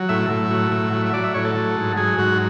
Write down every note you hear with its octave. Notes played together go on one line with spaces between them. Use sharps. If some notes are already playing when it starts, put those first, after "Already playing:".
Already playing: F#3
A2 E5
A2
F#3
A2
F#3
E5
F#3 D5
E5
A2 C#5
A4
F#3
G#2
F#3 G#4
G#2 F#4